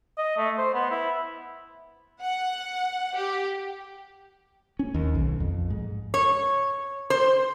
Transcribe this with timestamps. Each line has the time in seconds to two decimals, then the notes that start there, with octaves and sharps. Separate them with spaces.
0.17 D#5
0.37 A3
0.58 C5
0.74 B3
0.91 E4
2.21 F#5
3.15 G4
4.79 C#4
4.94 D#2
5.15 B1
5.40 F2
5.70 G#2
6.14 C#5
7.10 C5